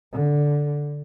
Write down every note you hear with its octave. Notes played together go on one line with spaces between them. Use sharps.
D3